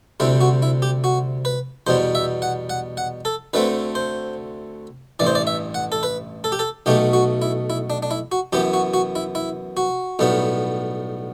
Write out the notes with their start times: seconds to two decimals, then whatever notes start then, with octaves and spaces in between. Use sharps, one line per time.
0.20 D2 C3 G3 C4 E4
0.41 F#4
0.62 E4
0.82 G4
1.04 F#4
1.45 B4
1.87 E2 B2 G3 C5
2.15 E5
2.42 F#5
2.70 F#5
2.97 F#5
3.25 A4
3.54 D2 D3 A3 C4 B4
3.95 C5
5.20 A1 G2 E3 D5
5.27 C5
5.35 D5
5.47 E5
5.74 F#5
5.92 A4
6.03 B4
6.44 A4
6.52 G4
6.59 A4
6.86 B1 B2 A3 G4
7.13 F#4
7.42 E4
7.70 E4
7.90 D4
8.03 D4
8.11 E4
8.32 F#4
8.53 F#2 E3 B3 G4
8.74 F#4
8.94 F#4
9.16 E4
9.35 E4
9.77 F#4
10.19 B1 A2 G3 B3